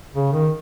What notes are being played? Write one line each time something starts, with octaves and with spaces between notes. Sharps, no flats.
C#3
D#3